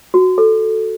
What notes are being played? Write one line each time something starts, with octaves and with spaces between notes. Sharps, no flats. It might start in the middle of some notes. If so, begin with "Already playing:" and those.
F#4
A4